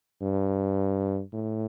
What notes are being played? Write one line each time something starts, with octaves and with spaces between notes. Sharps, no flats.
G2
A2